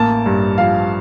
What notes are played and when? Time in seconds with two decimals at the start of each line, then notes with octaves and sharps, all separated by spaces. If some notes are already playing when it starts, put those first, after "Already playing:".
Already playing: A1 A#3 A5
0.26 G2
0.58 F3 F5